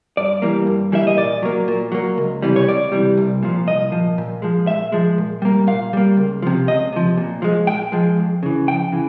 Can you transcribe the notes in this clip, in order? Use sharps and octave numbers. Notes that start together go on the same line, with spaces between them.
G2 D5
E3 G3 A#3
G2
E3 G3 A#3 E5
D#5
A#2 D5
F#3 A#3
A#2
F#3 A#3
C#2
C3 E3 G3
C#5
C#2 D5
C3 E3 G3
C2
A#2 F3
C2 D#5
A#2 F3
A#2
F3 G#3
A#2 E5
F3 G#3
A#2
G3 A#3
A#2 F5
G3 A#3
C#2
C3 F3
C#2 D#5
C3 F3
A#2
F3 G#3
A#2 G5
F3 G#3
F2
C#3 E3
F2 G5
C#3 E3